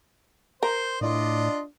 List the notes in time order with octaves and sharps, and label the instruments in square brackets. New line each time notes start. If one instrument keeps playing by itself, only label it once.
[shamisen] A#4 [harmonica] C5
[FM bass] A2 [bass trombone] D4 [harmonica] F4 D5 D#5